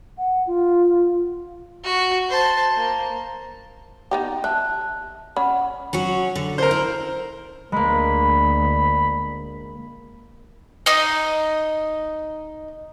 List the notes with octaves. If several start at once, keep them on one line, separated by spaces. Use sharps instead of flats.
F#5
F4
F#4
C5 A5
A#3
B3 D#4 G4
E5 A5 F#6
C#4 F#5 B5
F#3 C#4 F#4
D3
A#4 C5
E4
D2 G#3 A#3 B5
D#4 D#5